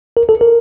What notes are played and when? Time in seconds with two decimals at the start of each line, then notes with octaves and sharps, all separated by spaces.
0.17 A#4
0.29 A4
0.41 A#4